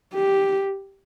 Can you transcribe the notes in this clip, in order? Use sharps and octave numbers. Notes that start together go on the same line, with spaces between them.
G4